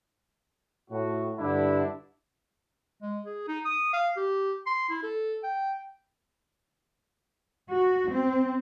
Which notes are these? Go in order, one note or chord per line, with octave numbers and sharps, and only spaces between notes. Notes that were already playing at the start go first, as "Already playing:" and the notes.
A2 F#4
G2 D3 D4 E4
G#3
G#4
D#4
D#6
F5
G4
C6
E4
A4
G5
F#4
C4